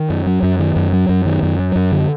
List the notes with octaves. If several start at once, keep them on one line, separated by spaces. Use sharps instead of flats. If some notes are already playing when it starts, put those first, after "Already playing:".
Already playing: D#3
F#2
F#3
F#2
D#3
F#2
F#3
F#2
D#3
F#2
F#3
F#2
D3